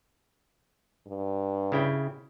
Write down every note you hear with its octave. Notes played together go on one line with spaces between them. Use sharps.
G2
C#3 E4 G5